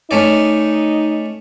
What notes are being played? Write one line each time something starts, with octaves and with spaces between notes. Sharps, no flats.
A3 C#4 D#4 D5